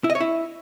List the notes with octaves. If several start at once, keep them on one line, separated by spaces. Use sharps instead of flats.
E4
D#5
C#5
E4